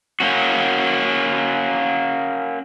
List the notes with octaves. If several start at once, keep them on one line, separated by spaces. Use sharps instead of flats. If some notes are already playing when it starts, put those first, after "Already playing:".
A#3 C#4 F#4